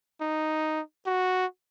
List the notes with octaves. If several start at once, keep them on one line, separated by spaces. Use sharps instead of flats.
D#4
F#4